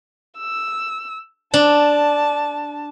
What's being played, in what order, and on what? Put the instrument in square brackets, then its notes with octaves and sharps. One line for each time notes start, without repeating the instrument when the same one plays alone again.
[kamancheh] E6
[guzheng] D4 [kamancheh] A5